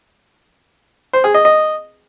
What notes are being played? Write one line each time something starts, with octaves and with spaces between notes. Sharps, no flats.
C5
G#4
D#5
D#5